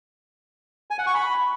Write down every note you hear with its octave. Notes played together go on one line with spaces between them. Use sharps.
G#5
F#5
C#6
B5